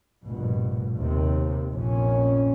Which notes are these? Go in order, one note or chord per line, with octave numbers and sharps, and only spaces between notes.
F1 A#1 G2 B2
D#2 C3
A#1 F2 A#2 C#4